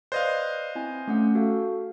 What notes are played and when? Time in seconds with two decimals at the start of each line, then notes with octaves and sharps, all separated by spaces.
0.12 B4 C5 D5 D#5 F5 F#6
0.75 C4 E4 G#5
1.07 A3 C#4 F#5
1.35 F#4 A4 F5